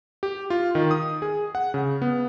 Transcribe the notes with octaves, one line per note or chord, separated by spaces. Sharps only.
G4
F4
D#3
D#6
G#4
F#5
C#3
B3